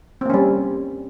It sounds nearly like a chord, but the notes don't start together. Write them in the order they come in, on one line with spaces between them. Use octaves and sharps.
C4 A#3 C#4 G3